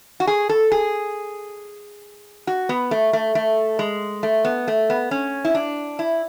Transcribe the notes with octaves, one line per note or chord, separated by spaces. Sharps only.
F#4
G#4
A4
G#4
F#4
B3
A3
A3
A3
G#3
A3
B3
A3
B3
C#4
E4
D4
E4